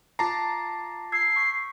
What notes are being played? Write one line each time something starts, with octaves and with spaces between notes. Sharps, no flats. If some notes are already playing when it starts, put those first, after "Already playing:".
F4 A5 A#5 D6 C7
E6 G#6 C7
C#6 G6 B6